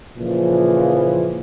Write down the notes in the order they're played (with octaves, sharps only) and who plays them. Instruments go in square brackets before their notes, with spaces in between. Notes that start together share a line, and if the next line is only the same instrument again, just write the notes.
[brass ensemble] A#2 C#3 E3 F3